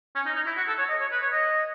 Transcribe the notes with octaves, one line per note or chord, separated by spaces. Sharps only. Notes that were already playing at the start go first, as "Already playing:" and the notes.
C#4
D#4
D#4
E4
F#4
A4
C#5
D#5
C#5
B4
C#5
D#5